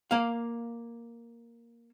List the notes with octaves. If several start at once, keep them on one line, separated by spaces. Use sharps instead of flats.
A#3 F5